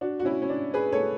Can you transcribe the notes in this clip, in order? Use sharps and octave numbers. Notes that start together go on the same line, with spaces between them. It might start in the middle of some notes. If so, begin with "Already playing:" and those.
D4 F#4
F#4
C#4 E4
C#4
D4
G#4 B4
A4 C#5